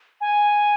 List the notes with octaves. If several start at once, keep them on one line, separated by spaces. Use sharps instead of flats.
G#5